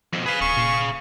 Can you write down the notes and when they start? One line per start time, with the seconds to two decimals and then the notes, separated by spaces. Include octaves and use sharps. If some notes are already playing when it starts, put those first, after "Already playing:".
0.13 F2 B2
0.26 G#4 B4 F5
0.41 D1 C#6
0.57 A#2